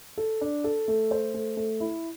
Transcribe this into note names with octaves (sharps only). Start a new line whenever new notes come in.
A4
D4
A4
A3
C5
A3
A3
E4